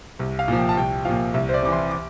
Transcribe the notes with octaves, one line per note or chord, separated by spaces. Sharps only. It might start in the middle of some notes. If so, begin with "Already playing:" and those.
C2
F5
A#2 F3
G5
A5
C2 G5
A#2 F3 F5
C2 E5
C5
D5
C3 E3 D6
C6
D6